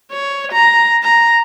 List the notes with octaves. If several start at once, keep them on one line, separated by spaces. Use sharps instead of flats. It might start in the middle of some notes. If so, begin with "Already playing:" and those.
C#5
A#5
A#5